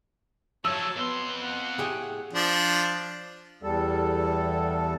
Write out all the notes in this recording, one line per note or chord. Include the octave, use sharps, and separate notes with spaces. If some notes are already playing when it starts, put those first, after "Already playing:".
F3 F#3 C#5 A5 E6
F2 B3 C6
F#5
A2 G4 G#4
F3 D4
E2 G3 A4